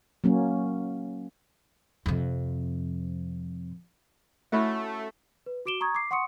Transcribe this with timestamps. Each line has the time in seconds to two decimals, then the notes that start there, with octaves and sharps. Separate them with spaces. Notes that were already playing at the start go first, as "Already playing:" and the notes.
0.24 F#3 A#3 C#4
2.06 F2 C3
4.52 A3 C#4 E4 F#4
5.46 B4
5.66 F#4 D6 D7 E7 G7
5.81 A#5 C#6 D#6 G#6
5.95 D6 C7
6.11 F#5 C6 C#6 D#6 C#7